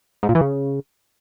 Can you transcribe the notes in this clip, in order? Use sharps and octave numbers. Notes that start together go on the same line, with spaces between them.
G#2
A#2
E3
C#3